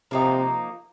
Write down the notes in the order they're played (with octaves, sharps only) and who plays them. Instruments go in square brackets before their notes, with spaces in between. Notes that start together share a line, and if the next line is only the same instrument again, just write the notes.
[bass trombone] C3 [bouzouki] F3 A#3 D#4